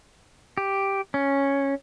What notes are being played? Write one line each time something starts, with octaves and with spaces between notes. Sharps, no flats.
G4
C#4